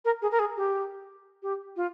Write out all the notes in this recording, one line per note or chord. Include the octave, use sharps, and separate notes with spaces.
A#4
G#4
A#4
G#4
G4
G4
F4